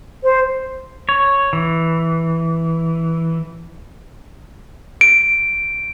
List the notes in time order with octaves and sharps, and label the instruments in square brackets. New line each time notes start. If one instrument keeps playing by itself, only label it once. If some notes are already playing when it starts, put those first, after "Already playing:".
[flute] C5
[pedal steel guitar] C#5
E3
[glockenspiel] D7